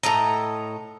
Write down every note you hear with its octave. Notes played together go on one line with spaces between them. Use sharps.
A2 A4 D#5 A#5